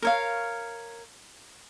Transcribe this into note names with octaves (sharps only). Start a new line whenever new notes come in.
A#4 C#5 F5